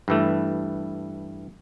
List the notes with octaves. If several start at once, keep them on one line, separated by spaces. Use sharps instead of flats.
G2 E3 A3